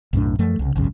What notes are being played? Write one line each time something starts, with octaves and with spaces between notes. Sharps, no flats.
B1 F#2 A2 D4
F#2 F3 A3
C2 C#3
G#1 C#2 F#2 C#3